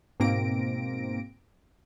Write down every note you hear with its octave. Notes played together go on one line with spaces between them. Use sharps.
G#2 B2 A#3 C4 A#6 D7